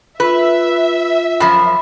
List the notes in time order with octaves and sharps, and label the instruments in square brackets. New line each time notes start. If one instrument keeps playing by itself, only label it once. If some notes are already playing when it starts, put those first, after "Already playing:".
[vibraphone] F4 [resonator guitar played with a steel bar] B4 [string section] E5
[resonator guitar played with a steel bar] F#2 F3 [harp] B5